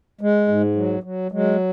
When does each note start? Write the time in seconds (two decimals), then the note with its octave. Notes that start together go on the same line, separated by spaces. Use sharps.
0.21 G#3
0.48 G#2
0.75 F#3
1.03 F#3
1.32 F#3 G#3